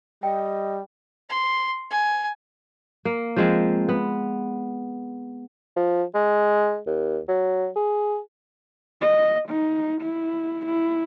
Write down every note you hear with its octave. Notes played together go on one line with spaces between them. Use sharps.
G3 D#5 G5
C6
G#5
A#3
F3 G#3 C4
B3
F3
G#3
D#2
F#3
G#4
D#5
D#4
E4
E4